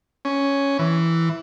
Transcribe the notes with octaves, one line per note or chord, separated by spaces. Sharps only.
C#4
E3